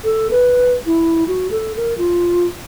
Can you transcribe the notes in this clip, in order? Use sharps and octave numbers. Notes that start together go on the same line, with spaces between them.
A4
B4
E4
F#4
A4
A#4
F4